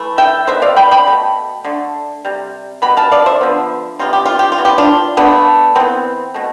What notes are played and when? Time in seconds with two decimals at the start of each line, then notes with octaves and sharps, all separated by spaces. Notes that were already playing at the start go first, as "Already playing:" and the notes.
Already playing: E3 A3
0.18 E5 G5
0.47 B2 B3 C5 E5
0.62 D5 F5
0.77 G5 B5
0.91 G5 B5
1.06 B2 A3
1.65 D3 A3
2.25 C3 G3
2.82 B2 G3 B3 B5
2.97 F5 A5
3.12 D5 F5
3.26 C5 E5
3.41 D3 F3 B3
3.99 C3 G3 B3 F4
4.13 G4
4.26 F4
4.39 G4
4.52 F4
4.58 E3 B3
4.65 G4
4.78 D4 F4
5.17 D3 A3 B3 D4
5.75 E3 B3 C4
6.34 B2 A3